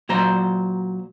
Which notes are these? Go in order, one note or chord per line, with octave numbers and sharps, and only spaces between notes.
A#2 F#3 C5 A#5